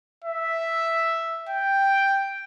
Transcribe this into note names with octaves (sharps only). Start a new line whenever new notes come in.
E5
G5